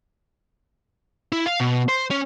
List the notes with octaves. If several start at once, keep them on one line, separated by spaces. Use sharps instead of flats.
E4
F5
B2
C5
C#4